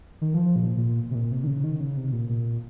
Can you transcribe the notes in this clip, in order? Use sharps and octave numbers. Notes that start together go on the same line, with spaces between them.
D#3
F3
A#2
A#2
C3
A#2
C3
D#3
C#3
D#3
C#3
C3
A#2
A#2